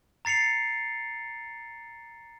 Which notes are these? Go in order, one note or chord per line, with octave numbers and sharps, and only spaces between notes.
A#5 A6 C7 C#7 F7